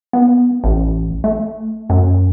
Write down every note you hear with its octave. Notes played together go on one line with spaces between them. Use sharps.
B3
A1
A3
F#2